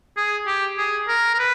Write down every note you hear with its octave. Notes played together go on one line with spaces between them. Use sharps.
G#4
G4
G#4
A#4
A#4
B4